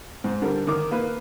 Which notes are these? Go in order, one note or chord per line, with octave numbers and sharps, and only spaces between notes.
G#2
D3 G3 A#4
D#3 A#4 D6 D#6
A#3 B4